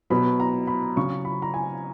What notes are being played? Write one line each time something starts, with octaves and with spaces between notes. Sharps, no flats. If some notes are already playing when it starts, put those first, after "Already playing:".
B2 F#3 B5
A#5
B5
C#3 F#3 C#6
B5
A#5
G#5